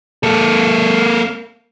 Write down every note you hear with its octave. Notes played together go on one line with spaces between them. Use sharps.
A#3 A4